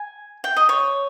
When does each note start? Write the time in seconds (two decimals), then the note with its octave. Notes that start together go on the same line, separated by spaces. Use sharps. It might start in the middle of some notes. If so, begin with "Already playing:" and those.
Already playing: G#5
0.44 G5
0.56 D#5
0.69 C#5